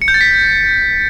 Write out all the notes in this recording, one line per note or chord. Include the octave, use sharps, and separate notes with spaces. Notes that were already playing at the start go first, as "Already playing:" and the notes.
C#7
G6
A6
B6